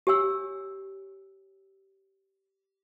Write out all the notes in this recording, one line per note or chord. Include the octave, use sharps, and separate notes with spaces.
G4 C#5 G#5 E6